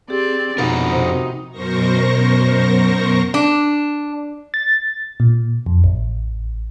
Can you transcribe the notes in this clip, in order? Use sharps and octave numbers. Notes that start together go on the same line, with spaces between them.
C4 G4 G#4 D5
F2 B2 C4 D#4 A#4 F#5
C3 C5
F#2 B2 A#4 C5 C#6 A#6
D4
A6
A#2
F2
A1